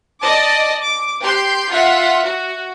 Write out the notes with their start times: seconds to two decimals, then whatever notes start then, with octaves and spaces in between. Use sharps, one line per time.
0.21 D5 D#5 A5 D6
0.81 D6
1.23 G4 C6 G6
1.71 F4 E5 F#5 B6
2.23 F#4